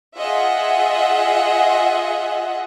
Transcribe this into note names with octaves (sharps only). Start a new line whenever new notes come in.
F4 G#4 D#5 E5 F#5